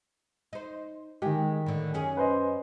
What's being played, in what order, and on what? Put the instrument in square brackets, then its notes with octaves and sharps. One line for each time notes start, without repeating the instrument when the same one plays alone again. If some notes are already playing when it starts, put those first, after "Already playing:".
[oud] D#4 C5
[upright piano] D#3 G4 [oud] G#3
[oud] A2 D3
F#2 C#4 G#4
[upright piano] B4 C5 D#5